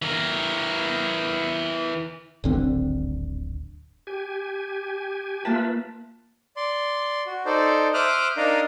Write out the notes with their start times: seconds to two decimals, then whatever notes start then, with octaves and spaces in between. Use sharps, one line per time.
0.02 E3 A#4
2.44 D1 G#1 D3 C4
4.07 G4 G#5
5.45 A#3 F4 B4 E5 A5
6.57 D5 C6
7.26 F#4
7.46 D#4 A4 C5 D5
7.94 C5 E5 D6 D#6 F6 F#6
8.37 D4 D#4 A#4 D#5 F5 D#6